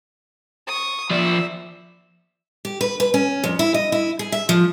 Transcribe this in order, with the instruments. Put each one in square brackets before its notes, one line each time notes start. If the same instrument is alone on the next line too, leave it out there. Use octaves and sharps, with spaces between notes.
[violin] C#6 D#6
[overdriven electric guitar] F3 D5 [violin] E5
[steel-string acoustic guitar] G4
B4
B4
C#4
F2
E4
D#5
E4
G#4
E5
F3